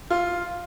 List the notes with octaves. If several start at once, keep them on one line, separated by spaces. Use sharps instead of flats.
F4